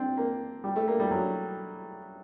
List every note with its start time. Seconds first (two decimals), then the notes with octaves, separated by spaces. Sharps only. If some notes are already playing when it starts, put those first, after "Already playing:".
Already playing: C4 D4
0.17 A#3
0.64 G3
0.76 A3
0.88 A#3
1.00 G3
1.11 F#3